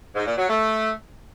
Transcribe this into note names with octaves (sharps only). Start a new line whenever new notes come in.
G#2
A#2
F#3
A3